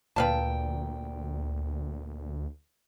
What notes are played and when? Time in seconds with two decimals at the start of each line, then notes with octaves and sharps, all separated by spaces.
0.16 D2 A#2 B4 F5 G5 A5